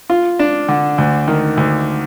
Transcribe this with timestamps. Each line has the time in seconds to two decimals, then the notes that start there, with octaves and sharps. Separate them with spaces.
0.10 F4
0.39 D4
0.69 D3
0.98 D2
1.28 D#3
1.57 D2